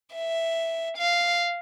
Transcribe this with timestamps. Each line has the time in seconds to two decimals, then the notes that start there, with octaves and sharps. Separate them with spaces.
0.15 E5
0.97 F5